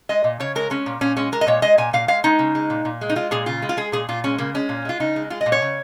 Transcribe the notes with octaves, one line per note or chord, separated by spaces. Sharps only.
G#3 D#5
A#2
C#3 C#5
G#3 A#4
G#3 C#4
A#2
A#2 C#4
G#3 C#4
G#3 A#4
D#5
A#2 C#5
G#3 D#5
A#2 G#5
A#2 F5
G#3 F5
G#3 D#4
C#3
G#3
A#2
A#2
G#3
D#4
G#3 F4
A#2 G#4
C#3 F4
G#3
F4
G#3 G#4
A#2 G#4
A#2 F4
G#3 C#4
C#3 A#3
G#3 C#4
A#2
G#3 F4
C#3 D#4
G#3
G#3 F4
D#5
A#2
C#5
C#3